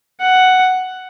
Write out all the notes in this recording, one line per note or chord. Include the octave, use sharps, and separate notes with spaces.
F#5